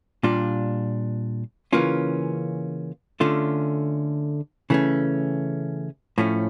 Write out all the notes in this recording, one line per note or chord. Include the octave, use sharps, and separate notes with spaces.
A#2 G3 D4 F4
C#3 E3 A#3 C#4 F4
D3 A3 C#4 F4
C#3 E3 A3 C#4
A2 F3 A3 C#4